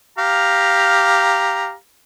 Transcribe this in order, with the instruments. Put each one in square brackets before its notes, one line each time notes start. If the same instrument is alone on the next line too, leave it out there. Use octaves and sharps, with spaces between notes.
[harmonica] G4 F5 A#5